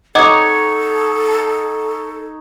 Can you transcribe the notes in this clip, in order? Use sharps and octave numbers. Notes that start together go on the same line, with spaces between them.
D#4 A4 C#5 D#5 F#5 D6 G#6